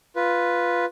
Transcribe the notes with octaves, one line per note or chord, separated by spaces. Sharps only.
F4 B4